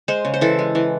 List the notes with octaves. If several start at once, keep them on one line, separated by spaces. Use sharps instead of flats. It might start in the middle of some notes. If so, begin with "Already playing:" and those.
G#3 C5
C#3
C5
E3 A4
G#3
E3